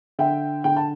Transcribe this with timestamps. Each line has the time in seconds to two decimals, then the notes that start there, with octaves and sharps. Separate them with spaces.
0.19 D3 E5 G5
0.64 D3 G5
0.77 A5